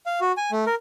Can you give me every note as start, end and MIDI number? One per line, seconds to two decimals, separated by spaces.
0.06 0.20 77
0.21 0.32 66
0.37 0.51 80
0.51 0.65 57
0.67 0.75 70